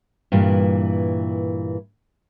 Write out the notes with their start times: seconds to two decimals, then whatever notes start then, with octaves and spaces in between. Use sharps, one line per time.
0.32 G2 A#2 E3 E4